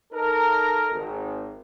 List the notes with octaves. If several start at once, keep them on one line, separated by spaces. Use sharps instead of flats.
D#4 A4 A#4
G#1